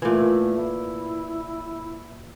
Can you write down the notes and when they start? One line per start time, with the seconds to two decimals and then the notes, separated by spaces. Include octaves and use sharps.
0.02 A#2 E3 A3
0.57 E4